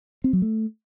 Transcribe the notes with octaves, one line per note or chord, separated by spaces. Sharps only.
C4
F#3
A3